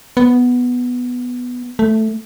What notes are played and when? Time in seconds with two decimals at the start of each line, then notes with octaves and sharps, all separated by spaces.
0.17 B3
1.79 A3